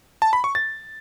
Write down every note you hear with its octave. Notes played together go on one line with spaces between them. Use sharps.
A5
B5
C#6
A6